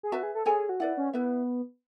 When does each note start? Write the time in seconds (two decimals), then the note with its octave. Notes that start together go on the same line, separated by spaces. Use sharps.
0.03 G#4
0.12 F#4 B4 E5 A5
0.23 G#4
0.35 A4
0.46 G#4 A4 C#5 G#5
0.69 F#4
0.80 E4 B4 D5 F#5
0.97 C#4
1.13 B3 E4 B4 E5